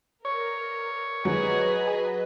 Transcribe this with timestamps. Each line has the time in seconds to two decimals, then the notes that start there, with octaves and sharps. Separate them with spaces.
0.25 A#4 C#5
1.25 F#3 G#4 B4 D#5